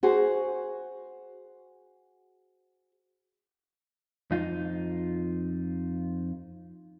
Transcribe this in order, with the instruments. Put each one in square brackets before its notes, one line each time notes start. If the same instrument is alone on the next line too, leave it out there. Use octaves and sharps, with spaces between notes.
[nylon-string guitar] F#4 G#4 C5
[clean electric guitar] F2 D#4 F4